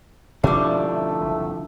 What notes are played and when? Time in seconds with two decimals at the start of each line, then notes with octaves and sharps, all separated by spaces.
0.44 B2 D3 F3 G3 A3 C#4 D4 E4
1.21 F#1 C2 C3